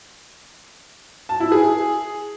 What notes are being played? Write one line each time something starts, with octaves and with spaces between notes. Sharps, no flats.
A5
E4
G#4